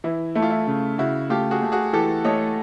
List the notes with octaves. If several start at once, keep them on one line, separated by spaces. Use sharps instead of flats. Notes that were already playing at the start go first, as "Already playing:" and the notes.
E3 E4
A3 E4
F4
E4
C#3
C#3 E4 F#4
A3 F4 G4
F#4 G#4
A3
F#4 G#4
E3 G4 A4
A3 C#5 D#5